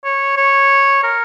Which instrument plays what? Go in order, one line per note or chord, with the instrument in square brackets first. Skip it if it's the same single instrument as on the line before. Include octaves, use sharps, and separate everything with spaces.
[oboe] C#5
C#5
A#4